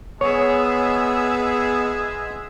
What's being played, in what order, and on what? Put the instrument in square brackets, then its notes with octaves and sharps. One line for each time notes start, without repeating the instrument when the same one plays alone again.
[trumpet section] G#3 G#5 [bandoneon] B3 [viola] G#4 E5 [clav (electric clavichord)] C#5